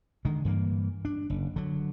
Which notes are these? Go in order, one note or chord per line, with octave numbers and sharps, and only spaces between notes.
D3 D#3 G#3
G2 E3 A#3
D4
F#1
D3 F#3